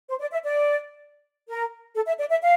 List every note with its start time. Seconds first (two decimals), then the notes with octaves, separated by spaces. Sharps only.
0.09 C5
0.20 D5
0.32 E5
0.44 D5
1.48 A#4
1.95 A4
2.06 E5
2.18 D5
2.30 E5
2.41 F5